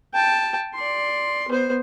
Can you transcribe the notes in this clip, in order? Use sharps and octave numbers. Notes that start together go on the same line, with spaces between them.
G5 A5
D5 C6
B3 C5